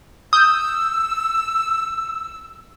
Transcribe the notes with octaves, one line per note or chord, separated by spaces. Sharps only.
D#6 E6 G6